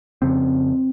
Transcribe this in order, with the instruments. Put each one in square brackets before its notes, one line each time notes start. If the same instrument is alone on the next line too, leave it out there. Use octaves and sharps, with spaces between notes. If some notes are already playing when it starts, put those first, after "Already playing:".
[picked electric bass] F2 C#3 C4